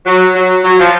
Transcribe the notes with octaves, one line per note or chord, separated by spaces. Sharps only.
F#3
F#3
F#3
F3